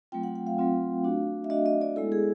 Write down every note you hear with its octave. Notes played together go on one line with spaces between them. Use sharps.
F#3 A3 C4 F4 G5
F#5
F#5
F5
F#3 A3 C4 F4
A3 D4 F#4
E5
A3 D4 F#4 D#5
D#5
D5
G#3 B3 E4 A4
G#4